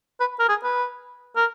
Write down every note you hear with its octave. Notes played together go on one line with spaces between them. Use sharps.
B4
A#4
G#4
B4
A#4